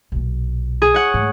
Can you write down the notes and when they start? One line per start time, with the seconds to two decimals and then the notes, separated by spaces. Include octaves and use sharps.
0.12 B1 A#2
0.82 G#4
0.94 C#5 F#5
1.14 G#2 A3